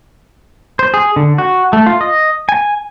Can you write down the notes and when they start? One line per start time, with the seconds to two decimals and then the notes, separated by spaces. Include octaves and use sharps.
0.79 C5
0.94 G#4
1.16 D3
1.38 F#4
1.73 A3
1.86 F4
2.01 D#5
2.49 G#5